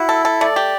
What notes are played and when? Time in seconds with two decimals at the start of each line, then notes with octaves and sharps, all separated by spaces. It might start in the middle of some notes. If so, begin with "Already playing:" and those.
Already playing: E4 F#4
0.09 A4
0.25 A4
0.41 A3 D5
0.56 G4